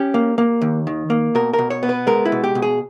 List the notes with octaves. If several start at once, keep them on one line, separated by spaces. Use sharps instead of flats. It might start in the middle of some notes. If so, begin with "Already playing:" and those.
Already playing: C#4 G4
A#3
A#3
D#2
D#3
A#3
B2 A#4
B2 A#4
C#5
B3
B4
G#3 A#4
E4
B2
G4
B2
G#4